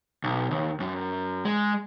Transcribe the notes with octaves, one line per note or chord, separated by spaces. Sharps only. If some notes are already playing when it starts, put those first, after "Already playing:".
B1
D#2
F#2
G#3